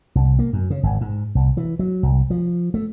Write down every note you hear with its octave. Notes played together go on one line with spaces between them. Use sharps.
C2
A#3
F#2
C#3
G#1
G#2
C2
E3
F#3
C2
F3
A3